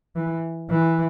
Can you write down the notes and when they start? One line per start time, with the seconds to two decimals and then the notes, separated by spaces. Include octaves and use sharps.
0.16 E3
0.70 E3